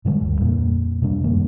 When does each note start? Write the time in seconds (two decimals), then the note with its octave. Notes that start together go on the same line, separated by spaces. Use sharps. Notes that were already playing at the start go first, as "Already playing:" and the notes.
0.05 G2 D3 G3 G#3
0.21 D1
0.41 F2 A#2 A#3
1.02 C3 G3 D4
1.24 F#2 D#3 A#3